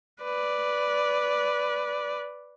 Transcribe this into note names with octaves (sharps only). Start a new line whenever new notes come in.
B4 D5